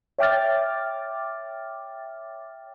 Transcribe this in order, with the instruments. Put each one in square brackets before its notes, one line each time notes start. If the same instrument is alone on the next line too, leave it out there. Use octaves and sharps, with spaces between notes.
[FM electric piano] C#5 E5 G5 D6 F6 A6